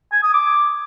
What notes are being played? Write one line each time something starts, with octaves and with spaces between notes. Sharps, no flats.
G#5
D#6
D6